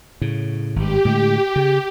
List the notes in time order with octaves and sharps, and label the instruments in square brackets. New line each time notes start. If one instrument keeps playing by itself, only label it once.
[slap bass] A2 C#3
[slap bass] G#1 G2 [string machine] G4
[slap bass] A2 D3 G#3
C#3